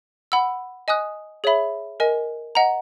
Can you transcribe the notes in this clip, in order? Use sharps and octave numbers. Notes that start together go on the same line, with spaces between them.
F#5 B5 E6
D#5 G#5 D#6 F#6
G#4 C#5 E5 B5
A#4 D#5 G#5
D#5 F#5 A#5